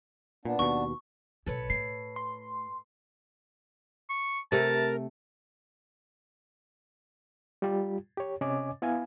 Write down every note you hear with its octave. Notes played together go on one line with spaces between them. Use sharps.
A#2 B3 D4
D#2 B2 C#6
B1 A2 A4 B4 C#5
A2 C7
C6
C#6
C3 A3 A#4 A5
G3 F4 G4
G4 C#5
C3 C#4 C#5 D#5 G#5 D6
B3 E4 B4 F5 G#5